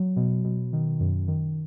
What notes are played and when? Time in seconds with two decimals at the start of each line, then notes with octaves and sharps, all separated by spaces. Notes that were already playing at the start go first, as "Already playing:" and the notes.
Already playing: F#3
0.16 B2
0.45 B2
0.73 D#3
1.00 F#2
1.28 D#3